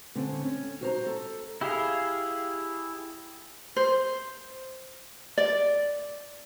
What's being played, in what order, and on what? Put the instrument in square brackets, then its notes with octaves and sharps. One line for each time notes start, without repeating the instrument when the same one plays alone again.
[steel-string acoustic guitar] D3 C4 C#4
C#4
F#4 C5 A#5
A4
[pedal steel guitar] E4 G4 G#4 F5
[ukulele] C5
D5